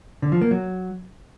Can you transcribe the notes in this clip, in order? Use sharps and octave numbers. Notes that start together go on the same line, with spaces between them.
D3
F3
A#3
F#3